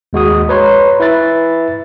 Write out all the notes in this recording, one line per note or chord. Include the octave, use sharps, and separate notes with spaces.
D#2 G#3 F#4 D#6
B4 C#5 A#5 C6
E4 B4 E5 A6